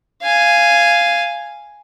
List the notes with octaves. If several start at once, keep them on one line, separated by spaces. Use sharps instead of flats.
F5 G#5